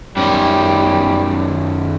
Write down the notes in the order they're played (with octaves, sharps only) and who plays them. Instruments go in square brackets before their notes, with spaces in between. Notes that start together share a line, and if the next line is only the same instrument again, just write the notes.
[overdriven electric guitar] F#2 D#3 [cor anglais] G3